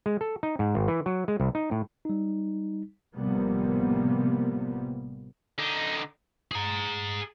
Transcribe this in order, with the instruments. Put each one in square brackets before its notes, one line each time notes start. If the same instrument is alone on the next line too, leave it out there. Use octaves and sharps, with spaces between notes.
[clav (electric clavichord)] G#3
A4
D#4
G#2
G#1
E3
F#3
G#3
C2
D#4
A2
[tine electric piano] G3 D#4
[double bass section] A1 C3 F3 G3 A#3 B3
[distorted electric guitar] D3 D#4
G#4 A#5